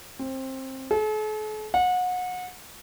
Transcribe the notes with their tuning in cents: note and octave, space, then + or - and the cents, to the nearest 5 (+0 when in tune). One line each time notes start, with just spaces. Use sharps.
C4 +20
A4 -45
F#5 -30